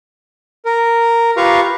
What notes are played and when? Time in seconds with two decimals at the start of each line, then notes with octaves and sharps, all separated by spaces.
0.66 A#4
1.37 F4 G4 B4 F5 A#5 C#6